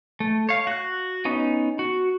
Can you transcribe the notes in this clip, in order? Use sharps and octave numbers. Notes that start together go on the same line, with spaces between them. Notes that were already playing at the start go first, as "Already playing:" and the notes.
A3
C#5 F5
F#4 F#6
B3 C#4 D#4
F#4